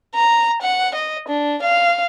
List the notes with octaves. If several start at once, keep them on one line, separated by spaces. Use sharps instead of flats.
A#5
F#5
D#5
D4
F5